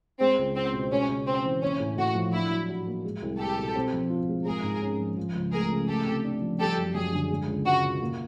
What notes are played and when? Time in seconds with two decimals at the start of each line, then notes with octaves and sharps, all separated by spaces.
0.19 G#3 C4
0.38 C#2
0.55 C4 C#4
0.73 B2
0.91 G#3 C#4
1.09 C#3
1.27 C4 C#4
1.45 E3
1.62 A#3 C#4
1.80 A2
1.97 A2 F#4
2.15 F3
2.33 D4 E4
2.50 F#3
2.69 F#4
2.87 A#3
3.05 G#3
3.22 C2
3.39 C4 G4 A4
3.58 B2
3.75 C4
3.93 F3
4.10 F4
4.29 G#3
4.46 G#3 G#4 A#4
4.63 G#2
4.82 C#4
4.99 F3
5.17 F3
5.35 C#2
5.52 A3 G#4 A#4
5.70 C#3
5.88 A3 G4 A4
6.06 C3
6.24 D4
6.42 F3
6.60 G3 G4 A4
6.77 F#2
6.95 F#2 G#4
7.13 D3
7.31 G#3
7.47 C#2
7.65 C#2 F#4
7.84 B2
8.02 A#3